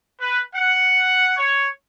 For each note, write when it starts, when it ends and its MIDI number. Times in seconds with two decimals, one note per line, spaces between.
0.20 0.41 71
0.55 1.33 78
1.37 1.68 73